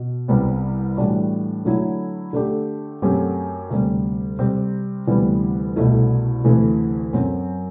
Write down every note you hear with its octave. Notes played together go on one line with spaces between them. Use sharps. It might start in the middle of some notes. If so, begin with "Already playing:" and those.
Already playing: B2
C2 C3 G3 B3
A2 E3 G3 D4 F#4
D3 F#3 A3 E4
D3 A3 D4 G4
F#2 F#3 A3 C4 G4
D2 C3 G3
C3 G3 C4 G4
D2 C3 E3 G3 B3
C2 B2 A3 E4
D2 C3 E3 A3
F#2 F#3 C4